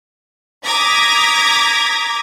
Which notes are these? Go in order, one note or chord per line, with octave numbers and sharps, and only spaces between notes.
A#5 D6 D#6 G#6 A#6 B6